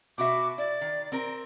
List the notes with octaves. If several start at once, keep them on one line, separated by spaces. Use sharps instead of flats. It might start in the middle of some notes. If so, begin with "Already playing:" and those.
B2 F#4 E5 D6
E4 D5
D#3
C4 A#4